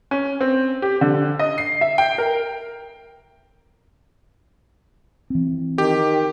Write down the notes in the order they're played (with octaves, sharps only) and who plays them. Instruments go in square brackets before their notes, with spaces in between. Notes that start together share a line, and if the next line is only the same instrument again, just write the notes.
[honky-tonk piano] C#4
C4
G4
D3
D#5
C7
E5
G5
A#4
[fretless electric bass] E3 C4
[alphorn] D#3 [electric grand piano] G4